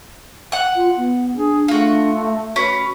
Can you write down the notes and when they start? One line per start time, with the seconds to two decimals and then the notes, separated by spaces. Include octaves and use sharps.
0.52 F#5 F#6
0.76 F4
0.97 B3
1.36 D4 G#4
1.68 A3 F4 F#4
2.56 C#4 F#4 B4